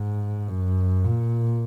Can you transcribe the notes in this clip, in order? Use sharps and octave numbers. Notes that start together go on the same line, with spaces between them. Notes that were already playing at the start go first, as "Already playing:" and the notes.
Already playing: G#2
F#2
A#2